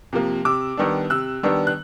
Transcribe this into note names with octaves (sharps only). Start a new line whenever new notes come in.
C3 F3 A#3
C3 D6 E6
D#3 G3 B3 D4
C3 E6 F#6
D#3 G3 B3 D4
F#6